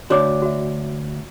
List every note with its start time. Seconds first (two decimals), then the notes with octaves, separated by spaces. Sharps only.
0.10 D2 D4 F#4 C#5 D6
0.42 F#4 E5